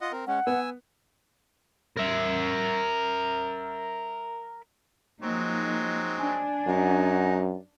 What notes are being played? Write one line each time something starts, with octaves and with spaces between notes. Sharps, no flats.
F4 D#5 F#5
C4 A#4
G#3 C#4 F#5
B3 G#5 E6
A#4 E5
F3 F#3 G#3 A#3 C4 D#4
D4 G#5
F#2 D#4 F#4